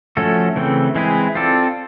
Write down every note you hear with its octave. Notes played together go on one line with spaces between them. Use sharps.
F3 A3 C#4 F#4 A4
C#3 E3 A3 C4
E3 G#3 C4 E4 G#4
C4 F4 A4 D5